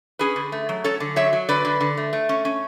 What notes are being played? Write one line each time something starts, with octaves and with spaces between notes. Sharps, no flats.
C#4 G#4 B4
D3
A3
F#3
C#4 A4 C#5
D3
F#3 C#5 E5
F#3
D3 B4 D5
D3
D3
A3
A3
C#4
C#4